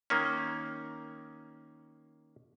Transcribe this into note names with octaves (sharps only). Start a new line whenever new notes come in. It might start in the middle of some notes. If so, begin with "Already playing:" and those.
D#3 A#3 C#4